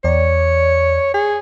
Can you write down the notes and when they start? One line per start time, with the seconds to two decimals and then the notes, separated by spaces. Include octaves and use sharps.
0.04 E2 C#5 D5
1.14 G#4